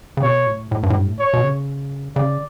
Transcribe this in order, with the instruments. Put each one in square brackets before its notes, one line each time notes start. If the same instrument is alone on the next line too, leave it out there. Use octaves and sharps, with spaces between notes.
[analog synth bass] C#3
[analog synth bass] B2 [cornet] C#5
[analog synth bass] A2
A2
G2
A2
G2
A2
[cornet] C#5
[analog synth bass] B2
C#3
[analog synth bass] C#3 [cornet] D5